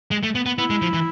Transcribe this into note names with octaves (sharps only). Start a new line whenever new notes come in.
G#3
A3
B3
B3
B3 E4
G#3
F3
E3